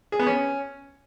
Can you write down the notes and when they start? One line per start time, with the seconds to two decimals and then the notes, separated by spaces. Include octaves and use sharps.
0.12 G#4
0.19 B3
0.27 C#4